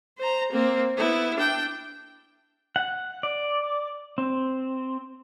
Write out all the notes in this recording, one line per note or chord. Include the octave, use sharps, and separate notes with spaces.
C5 A#5
A#3 C4
B3 E4
D4 G5
F#5
D5
C4